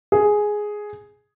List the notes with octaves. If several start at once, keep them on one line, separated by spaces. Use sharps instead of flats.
G#4